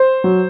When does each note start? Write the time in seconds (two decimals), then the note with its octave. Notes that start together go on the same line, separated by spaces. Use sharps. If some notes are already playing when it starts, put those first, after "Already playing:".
Already playing: C5
0.24 F#3